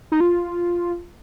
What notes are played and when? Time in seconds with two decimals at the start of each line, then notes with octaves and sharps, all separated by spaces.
0.12 D#4
0.20 F4